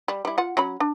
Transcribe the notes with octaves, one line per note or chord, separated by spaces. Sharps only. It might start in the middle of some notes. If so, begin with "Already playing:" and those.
G3
G3 E4
F4 F#5
F#3 C#4 B5
D4